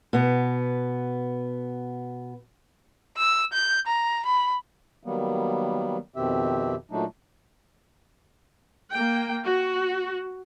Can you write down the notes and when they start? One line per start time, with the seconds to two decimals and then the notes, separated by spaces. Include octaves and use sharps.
0.13 B2 B3
3.17 E6
3.52 G6
3.87 A#5
4.25 B5
5.03 D#3 F#3 G3 A#3 B3
6.16 F2 B2 D#3 C4 G4 E5
6.91 A#2 F#3 A3 D4 D#4
8.91 A#3 G5
9.45 F#4